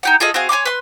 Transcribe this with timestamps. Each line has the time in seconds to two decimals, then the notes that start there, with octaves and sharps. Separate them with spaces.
0.03 D#4 G4 F#5
0.20 F4 G#4 A4 D#5
0.34 C4 F#4 G#4 F5
0.49 C#5 G#5 C6 D6
0.65 B4 C6